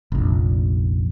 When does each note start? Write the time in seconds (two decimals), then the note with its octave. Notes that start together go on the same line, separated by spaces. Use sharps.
0.12 F1 A#1